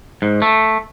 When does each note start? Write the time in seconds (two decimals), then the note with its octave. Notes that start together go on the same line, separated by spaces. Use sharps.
0.22 G#2
0.42 A3